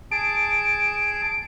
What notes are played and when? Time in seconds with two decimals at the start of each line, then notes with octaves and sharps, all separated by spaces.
0.11 G#4 A5 D7